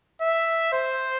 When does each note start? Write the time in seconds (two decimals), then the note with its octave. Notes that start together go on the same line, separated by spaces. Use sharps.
0.21 E5
0.73 C5